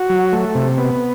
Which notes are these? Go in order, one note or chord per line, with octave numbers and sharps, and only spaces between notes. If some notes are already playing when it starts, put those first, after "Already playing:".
Already playing: F#4
F#3
A3
C3
B3